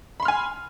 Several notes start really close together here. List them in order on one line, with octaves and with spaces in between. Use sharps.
B5 C6 F6 G#5